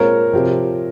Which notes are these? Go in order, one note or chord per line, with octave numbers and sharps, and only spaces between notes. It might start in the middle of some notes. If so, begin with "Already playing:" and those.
Already playing: A#2 G#3 C4 F4 A#4 C#5
C3 F3 C4 G4